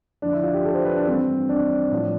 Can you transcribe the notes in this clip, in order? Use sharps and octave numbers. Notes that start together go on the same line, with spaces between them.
F2 D3 F3 D4
E4
F4
G4
A4
C5
B4
D4
G2 E3 C4
D4
A2 F3